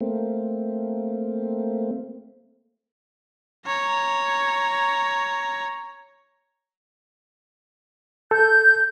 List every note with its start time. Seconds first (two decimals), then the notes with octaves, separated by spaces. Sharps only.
0.01 A3 A#3 C4
3.67 C#5 A#5
8.31 A4 G6